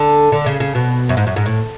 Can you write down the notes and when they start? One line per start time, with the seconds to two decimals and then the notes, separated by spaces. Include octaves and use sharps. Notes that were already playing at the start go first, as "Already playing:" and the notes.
Already playing: D3
0.32 D3
0.46 C#3
0.60 C#3
0.75 B2
1.09 F#2
1.17 G#2
1.27 F#2
1.36 G#2
1.46 A2